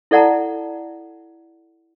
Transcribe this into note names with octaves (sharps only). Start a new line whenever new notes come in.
E4 A4 D5 F#5 A5 A#5